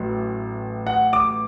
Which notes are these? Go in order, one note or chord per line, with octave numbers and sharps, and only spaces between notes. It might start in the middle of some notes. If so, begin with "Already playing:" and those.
Already playing: A1 A2 F#3
F#5
D6